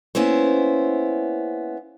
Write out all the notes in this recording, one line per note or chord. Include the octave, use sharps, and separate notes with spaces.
A#3 B3 C#4 E4 C5